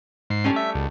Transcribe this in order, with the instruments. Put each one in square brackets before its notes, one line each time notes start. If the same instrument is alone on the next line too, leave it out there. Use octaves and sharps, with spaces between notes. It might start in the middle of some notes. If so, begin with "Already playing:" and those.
[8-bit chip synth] G#2 C7
[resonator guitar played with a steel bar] G3 A3 C#4
[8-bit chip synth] E5
C#2